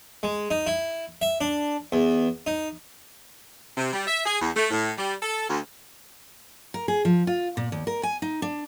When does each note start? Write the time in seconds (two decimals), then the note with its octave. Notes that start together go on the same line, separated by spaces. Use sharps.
0.23 G#3
0.51 D#4
0.67 E4
1.22 E5
1.41 D4
1.92 E2
2.47 D#4
3.77 C3
3.93 G3
4.08 E5
4.26 G#4
4.42 E2
4.56 A3
4.71 A2
4.98 G3
5.22 A4
5.50 D2
6.74 A#4
6.88 G#4
7.05 F3
7.27 F4
7.57 A#2
7.72 D#2
7.87 A#4
8.03 G#5
8.22 D#4
8.42 D4